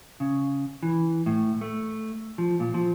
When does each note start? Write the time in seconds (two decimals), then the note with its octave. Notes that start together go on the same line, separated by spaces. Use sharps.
0.20 C#3
0.83 E3
1.26 A2
1.61 A3
2.38 F3
2.60 A#2
2.74 F3